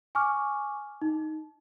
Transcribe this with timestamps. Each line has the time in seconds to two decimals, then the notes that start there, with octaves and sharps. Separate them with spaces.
0.15 G#5 C#6 D6 F6
1.02 D#4